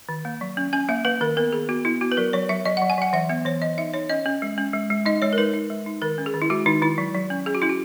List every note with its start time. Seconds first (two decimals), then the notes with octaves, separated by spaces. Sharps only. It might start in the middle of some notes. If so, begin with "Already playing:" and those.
0.09 D#3
0.25 A#3
0.41 F#3
0.57 C#4
0.73 C#4 G#5
0.89 A#3 E5
1.05 A#3 B4
1.21 D#3 A#4
1.37 B3 A#4
1.53 D#3 G#4
1.69 B3 F#4
1.85 B3 E4
2.01 B3 F#4
2.12 B4
2.17 F#3 A#4
2.33 F#3 C#5
2.49 F#3 E5
2.65 F#3 D#5
2.77 F#5
2.82 F#3
2.90 G#5
2.98 F#3 F#5
3.13 E3 E5
3.29 B3 E5
3.45 E3 C#5
3.61 E3 D#5
3.78 D#4 E5
3.94 D#4 C#5
4.09 C#4 D#5
4.26 C#4
4.42 G#3
4.58 C#4
4.73 G#3
4.90 G#3
5.06 D#4 D#5
5.22 G#3 C#5
5.33 A#4
5.38 D#4 B4
5.54 D#4
5.70 G#3
5.86 D#4
6.02 D#3 A#4
6.18 C#4
6.26 G#4
6.34 D#3
6.42 E4
6.50 G#3 F#4
6.66 D#3 D#4
6.82 D#3 E4
6.98 F#3
7.15 F#3
7.30 C#4
7.46 C#4 G#4
7.55 F#4
7.62 C#4 E4
7.69 F#4